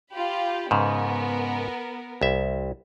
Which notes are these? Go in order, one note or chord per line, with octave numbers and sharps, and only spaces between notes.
F4 G4 B5
G#2 C#3 B3 A#4
C2 E5